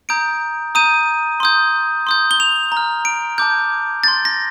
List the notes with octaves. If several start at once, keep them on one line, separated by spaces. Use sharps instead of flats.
A#5 D#6 G6 D7
A#5 D#6 G6 D#7
C6 D#6 G6
C6 D#6 G6
G7
F7
A#5
F6
D7
A5 D6 F6 G6
C6 G6 A6
A#6